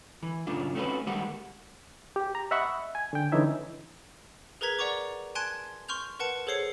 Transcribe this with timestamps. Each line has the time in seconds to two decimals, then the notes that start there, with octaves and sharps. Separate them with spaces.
0.23 E3
0.47 F#2 A2 C#3 D4 F4
0.75 A3 C4 C#4 F#4 B4
1.07 D#2 G3 G#3 A#3 C5 F#5
2.16 G4
2.35 A#5
2.51 D#5 E5 F#5 B5 C#6
2.95 G#5
3.13 D3 G5
3.32 D3 E3 C#4 D#4 E5 G#5
4.61 G#4 A#4 B4 A#5 G#6 B6
4.79 D5 F#5 A#5 C#6 D6
5.35 G#5 A5 C6 F#6 G#6 D7
5.88 C6 C#6 F6 G6 F7
6.19 A#4 B4 F#5 A5 C#7
6.47 G#4 A4 C5 C#5 C7 C#7